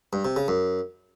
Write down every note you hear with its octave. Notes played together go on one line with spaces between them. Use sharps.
G2
C3
C#3
F#2